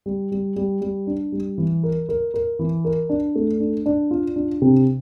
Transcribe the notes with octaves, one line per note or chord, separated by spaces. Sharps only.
G3
G3
G3
G3
D4
G3
E3
A#4
A#4
A#4
E3
A#4
D4
A3
D4
D4
F4
D4
C3